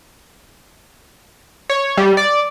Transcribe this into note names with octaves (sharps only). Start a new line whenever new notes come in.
C#5
G3
D5